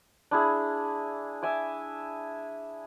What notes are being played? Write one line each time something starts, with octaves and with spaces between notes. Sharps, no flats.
D4 E4 G#4
E5 G#5 D6